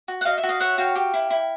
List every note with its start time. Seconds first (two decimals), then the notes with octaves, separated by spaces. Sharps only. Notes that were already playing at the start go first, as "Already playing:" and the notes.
0.08 F#4
0.21 F#5
0.25 F#4 D#5 F5
0.38 E5
0.43 F#4
0.49 D#5 F5
0.60 C#5 E5 F#5
0.78 F#4 F5 G5
0.95 G4
1.14 E4
1.30 E4